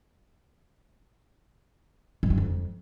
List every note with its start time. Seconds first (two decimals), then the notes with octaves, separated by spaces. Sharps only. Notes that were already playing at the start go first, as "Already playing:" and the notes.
2.23 G#2
2.30 G2
2.37 F2